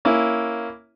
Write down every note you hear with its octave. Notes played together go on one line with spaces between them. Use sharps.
A#3 C#4 E4